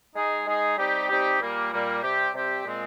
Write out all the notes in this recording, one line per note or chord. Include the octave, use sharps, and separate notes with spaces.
G#3 D#4 G#4
G#3 D#4 G#4
G3 C4 D#4 G4
G3 C4 D#4 G4
A#2 G3 A#3
A#2 G3 A#3
C3 G3 C4 G4
C3 G3 C4 G4
A#2 G#3 C4